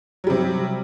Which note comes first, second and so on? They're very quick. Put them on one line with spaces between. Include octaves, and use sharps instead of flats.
F#3 G3 C3